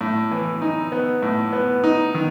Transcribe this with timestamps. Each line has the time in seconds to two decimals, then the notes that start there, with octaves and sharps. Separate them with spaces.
0.01 A2
0.31 E3
0.62 D#4
0.92 B3
1.22 A2
1.53 B3
1.84 D#4
2.14 D#3